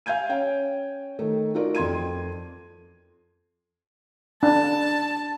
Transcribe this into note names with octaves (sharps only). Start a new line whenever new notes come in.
F5 G#5 G6 G#6 D#7
C#4 C#5 G5
D#3 A3 D#4
D#4 F4 F#4 A#4 D5
F2 C6 G#6 D#7
D4 A5